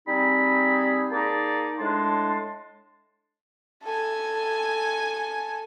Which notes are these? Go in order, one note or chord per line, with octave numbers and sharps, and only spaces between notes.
G3 C4 D#4 G#4 B5
A#3 D#4 G#4 D5 A5
A2 G#3 D4 A5 C6
A4 G#5